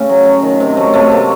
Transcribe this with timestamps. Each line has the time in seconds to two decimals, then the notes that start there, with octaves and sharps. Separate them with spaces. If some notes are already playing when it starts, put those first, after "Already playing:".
Already playing: C#3 A3
0.09 F#3
0.26 F#3
0.42 D#3
0.60 C3
0.77 F#3 A3
0.93 C3 A3
1.12 C3 A#3